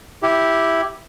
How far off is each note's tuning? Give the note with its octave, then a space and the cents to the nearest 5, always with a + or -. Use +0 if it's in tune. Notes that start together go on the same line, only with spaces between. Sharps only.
E4 +0 G4 +0